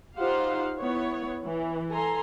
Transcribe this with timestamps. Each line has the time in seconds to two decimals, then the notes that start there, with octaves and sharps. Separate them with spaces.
0.17 D#4 F4 G4 C5 F5 F#5
0.78 B3 E4 C#5
1.44 E3
1.89 A4 G#5 A#5 C6